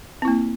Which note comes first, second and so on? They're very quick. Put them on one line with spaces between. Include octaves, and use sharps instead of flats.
C4 E4 A#3